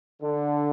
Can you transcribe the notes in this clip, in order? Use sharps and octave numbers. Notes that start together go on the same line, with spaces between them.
D3